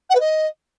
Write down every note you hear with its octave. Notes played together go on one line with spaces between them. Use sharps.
F#5
B4
D#5